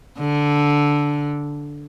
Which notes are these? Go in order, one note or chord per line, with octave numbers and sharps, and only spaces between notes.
D3